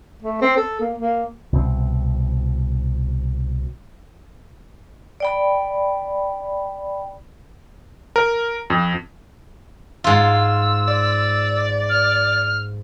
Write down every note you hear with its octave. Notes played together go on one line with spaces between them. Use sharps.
A3
C4
A4
A#3
A#3
C2 B2 C4
D5 G5 B5
A#4
F2
G#2 F4 E6
D5
F6